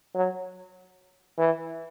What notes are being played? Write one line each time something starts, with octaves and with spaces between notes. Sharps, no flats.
F#3
E3